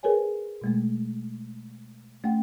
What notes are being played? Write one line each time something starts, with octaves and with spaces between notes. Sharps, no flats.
G#4 A#4 B4 C#5 G#5
B2 G#3 A3
A3 C#4 F#5 G5